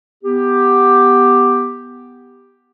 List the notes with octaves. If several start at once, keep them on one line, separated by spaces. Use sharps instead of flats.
B3 G4